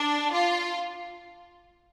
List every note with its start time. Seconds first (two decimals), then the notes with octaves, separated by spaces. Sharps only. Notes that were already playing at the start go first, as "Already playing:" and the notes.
Already playing: D4
0.34 F4